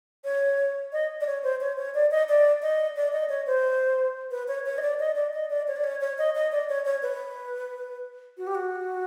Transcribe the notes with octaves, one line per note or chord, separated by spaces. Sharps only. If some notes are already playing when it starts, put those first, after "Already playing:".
C#5
D#5
D5
C#5
C5
C#5
C#5
D5
D#5
D5
D#5
D5
D#5
C#5
C5
B4
C#5
C#5
D#5
D5
D#5
D5
D#5
D5
C#5
D5
C#5
C#5
D#5
D#5
D5
C#5
C#5
B4
F#4
G4
F#4